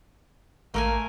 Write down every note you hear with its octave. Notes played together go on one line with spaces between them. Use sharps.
A1 A3 A#3 A#4 G#5